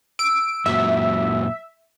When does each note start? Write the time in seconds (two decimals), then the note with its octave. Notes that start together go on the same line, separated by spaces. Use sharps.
0.19 E6 D7
0.66 F#2 A#2 F#3 E5